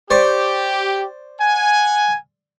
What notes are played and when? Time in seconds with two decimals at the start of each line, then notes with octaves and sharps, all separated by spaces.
0.10 G4 C5 D5 C#6
1.41 F#5 G#5